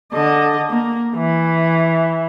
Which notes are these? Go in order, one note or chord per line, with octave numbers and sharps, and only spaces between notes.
D3 D#5
A#3
E3